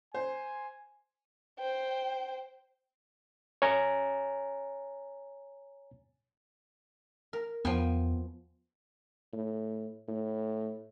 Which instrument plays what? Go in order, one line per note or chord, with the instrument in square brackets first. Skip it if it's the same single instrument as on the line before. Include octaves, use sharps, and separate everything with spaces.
[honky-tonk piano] C5 [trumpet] G#5
[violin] C5 G5
[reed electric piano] C#5 G#5 A#5
[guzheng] A#4
[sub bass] E2 [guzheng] F3 G5 G#5 [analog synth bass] B3
[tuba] A2
A2